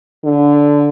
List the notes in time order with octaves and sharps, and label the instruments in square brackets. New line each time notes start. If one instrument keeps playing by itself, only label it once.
[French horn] D3